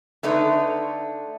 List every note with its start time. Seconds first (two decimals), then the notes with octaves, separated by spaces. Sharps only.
0.23 D3 A3 D#4 B4